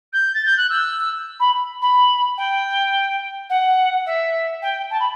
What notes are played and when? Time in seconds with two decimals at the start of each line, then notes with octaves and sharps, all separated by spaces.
0.12 G6
0.34 A6
0.45 G6
0.57 F#6
0.69 E6
1.39 B5
1.81 B5
2.37 G5
3.49 F#5
4.06 E5
4.62 G5
4.90 A5
4.99 B5